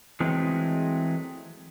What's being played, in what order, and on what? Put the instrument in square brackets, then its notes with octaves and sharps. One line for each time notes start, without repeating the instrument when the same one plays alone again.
[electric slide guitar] E3 F#3 G#3 A3 C4